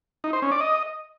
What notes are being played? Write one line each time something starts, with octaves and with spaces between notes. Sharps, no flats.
D#4
C5
C#4
D5
D#5